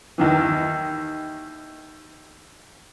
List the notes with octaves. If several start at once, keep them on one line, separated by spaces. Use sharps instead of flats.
D#2 D#3 E3